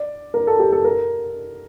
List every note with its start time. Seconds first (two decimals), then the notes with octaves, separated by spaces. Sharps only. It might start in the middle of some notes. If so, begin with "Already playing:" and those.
Already playing: D5
0.34 A#4
0.47 A4
0.59 G4
0.72 A4
0.84 A#4